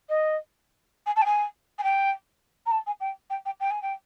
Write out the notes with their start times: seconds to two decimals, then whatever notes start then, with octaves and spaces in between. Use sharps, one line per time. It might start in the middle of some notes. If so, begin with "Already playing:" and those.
0.09 D#5
1.06 G#5
1.16 A5
1.22 G5
1.26 G#5
1.79 G#5
1.83 G5
2.66 A#5
2.71 A5
2.87 G#5
3.00 G5
3.30 G5
3.46 G5
3.60 G5
3.71 G#5
3.82 G5